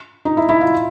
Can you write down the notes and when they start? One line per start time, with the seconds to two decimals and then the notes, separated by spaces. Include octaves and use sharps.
0.25 D#4
0.37 E4
0.49 E4
0.61 F4